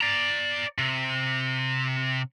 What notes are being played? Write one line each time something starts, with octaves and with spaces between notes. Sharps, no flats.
D5 A#5
C3